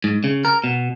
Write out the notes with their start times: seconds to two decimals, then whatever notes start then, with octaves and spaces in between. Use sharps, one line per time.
0.04 G#2
0.24 C#3
0.45 A#4
0.64 B2